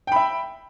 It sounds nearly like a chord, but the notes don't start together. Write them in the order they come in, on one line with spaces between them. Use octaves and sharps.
G5 B5 E5